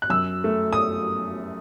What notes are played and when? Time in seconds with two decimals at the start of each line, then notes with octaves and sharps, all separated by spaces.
0.02 F#6
0.10 F#2 E6
0.44 A3
0.73 D#6